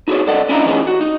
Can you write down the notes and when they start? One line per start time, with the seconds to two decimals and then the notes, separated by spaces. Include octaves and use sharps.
0.08 D#4 F#4 G#4 C#5
0.27 C2 A4 D5 D#5 F#5
0.49 C#4 D4 E4 F4 D#5 A#5
0.65 A2 E3 F3 C#4 D#4 G#4
0.87 F#4
1.01 D#4